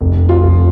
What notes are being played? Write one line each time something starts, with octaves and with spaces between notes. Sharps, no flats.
F1
F4
F1